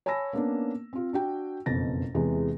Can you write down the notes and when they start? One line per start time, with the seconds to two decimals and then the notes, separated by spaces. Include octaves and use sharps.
0.06 C#5 G#5 A5 B5 E6 A#6
0.33 A#3 B3 C#4 D4
0.93 C4 F4
1.13 D4 F#4 G5
1.66 F#1 F2 B2 A6 A#6
2.15 E2 C3 E3 G#3